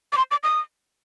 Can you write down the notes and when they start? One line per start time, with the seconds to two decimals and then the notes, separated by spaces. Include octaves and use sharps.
0.13 D6
0.17 C6
0.31 D6
0.43 D#6